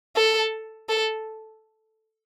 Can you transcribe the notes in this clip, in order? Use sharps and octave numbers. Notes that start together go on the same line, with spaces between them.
A4
A4